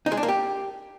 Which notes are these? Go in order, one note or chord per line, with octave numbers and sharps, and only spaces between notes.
D#4
G#3
D4
A#3
G4